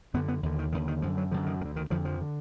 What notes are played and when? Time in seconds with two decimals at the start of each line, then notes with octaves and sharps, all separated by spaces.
0.14 F#2 D3 B3
0.28 B3
0.43 D#2 D3
0.59 D#3
0.72 D#2 D3 D#3
0.88 D#3
1.02 F#2 D3 F3
1.18 F#3
1.31 F#2 D3 F3
1.46 D#3
1.61 D2 D#3
1.65 D3
1.76 D#3
1.90 F2 D3 F3
2.05 F3
2.21 D3